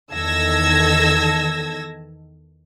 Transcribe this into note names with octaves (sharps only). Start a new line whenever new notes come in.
E2 D#3 A4 E6 G#6 A#6